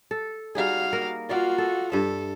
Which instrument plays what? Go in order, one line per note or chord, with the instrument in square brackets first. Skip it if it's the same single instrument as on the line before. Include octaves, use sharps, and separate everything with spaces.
[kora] A4
[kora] G3 D#4 G#4 [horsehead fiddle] F#4 F5
[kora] A#3 A#4
[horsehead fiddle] F4 F#4 [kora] D5 F5
[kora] A4
[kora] G2 E5 [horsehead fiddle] A4